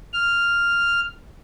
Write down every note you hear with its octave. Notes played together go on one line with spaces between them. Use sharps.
F6